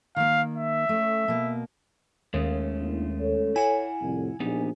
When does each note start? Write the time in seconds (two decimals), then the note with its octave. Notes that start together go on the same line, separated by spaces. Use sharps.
0.16 D#3 A#3 F5
0.55 E5
0.89 A3 C#4
1.28 B2 A#3
2.34 D#2 G#3 A3 C#4
2.83 A#3 D4 E4
3.21 A4 C#5
3.56 E4 F#5 G#5
4.02 C2 F2 A2
4.40 A#1 B3 D#4 G4